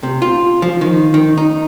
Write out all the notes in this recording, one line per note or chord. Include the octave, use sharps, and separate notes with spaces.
C3
F4
F3
D#3
D#3
D#4